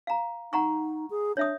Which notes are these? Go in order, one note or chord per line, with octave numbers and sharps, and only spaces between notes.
F5 A#5
D#4 F#5 A#5 C#6
G#4
D4 C#5 E5 D#6